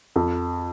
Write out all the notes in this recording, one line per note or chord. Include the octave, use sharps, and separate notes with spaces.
F2